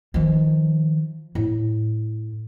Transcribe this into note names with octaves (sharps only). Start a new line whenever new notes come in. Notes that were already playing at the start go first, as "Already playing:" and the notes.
D#3 F3
A2